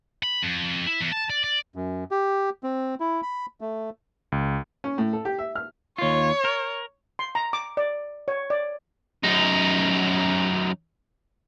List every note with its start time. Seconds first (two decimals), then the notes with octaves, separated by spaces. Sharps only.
0.23 B5
0.43 F2
0.87 E4
1.01 E2
1.12 A5
1.30 D5
1.44 D5
1.76 F#2
2.11 G4
2.63 C4
3.00 E4
3.23 B5
3.61 A3
4.32 C#2
4.84 C#4
4.98 A2
5.13 A4
5.25 G4
5.39 E5
5.55 F6
5.98 D#2 F4 C#5
6.45 A#4
7.19 C6
7.35 A#5
7.53 D6
7.77 D5
8.28 C#5
8.50 D5
9.23 F#2 D#4